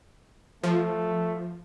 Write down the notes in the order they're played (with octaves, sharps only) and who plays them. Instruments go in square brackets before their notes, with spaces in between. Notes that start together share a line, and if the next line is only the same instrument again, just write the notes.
[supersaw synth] F3 [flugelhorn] A3